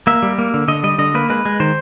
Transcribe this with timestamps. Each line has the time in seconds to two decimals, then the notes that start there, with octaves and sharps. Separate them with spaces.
0.07 A#3 E5
0.22 G3
0.38 A#3
0.54 D3
0.68 D3 D#5
0.83 G3 D#5
0.98 D3 D#5
1.14 A#3 B4
1.30 G#3 B4
1.45 G#3
1.60 D#3 C5